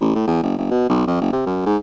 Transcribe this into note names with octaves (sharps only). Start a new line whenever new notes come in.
A1
A2
E2
F#1
F#1
B2
B1
F2
F#1
C3
F#2
G#2